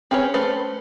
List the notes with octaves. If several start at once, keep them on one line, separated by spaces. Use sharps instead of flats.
C4 C#4 G#4 B4 C#5
A3 C#4 B4 C5